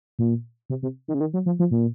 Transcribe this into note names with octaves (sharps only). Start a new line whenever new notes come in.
A#2
C3
C3
D#3
C#3
D#3
F#3
F3
F3
A#2